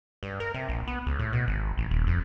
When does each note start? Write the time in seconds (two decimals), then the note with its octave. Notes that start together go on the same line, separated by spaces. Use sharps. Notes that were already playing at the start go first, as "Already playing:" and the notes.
0.23 G2
0.40 A#4
0.54 C3
0.69 A#1
0.87 B3
1.06 C#2
1.19 A2
1.33 B2
1.48 G#1
1.78 A1
1.91 D#1
2.07 F2